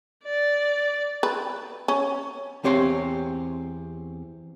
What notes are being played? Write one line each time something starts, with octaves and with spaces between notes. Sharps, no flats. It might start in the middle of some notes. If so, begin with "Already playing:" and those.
D5
B4
C#4
E2 C4 G4 C#5 C6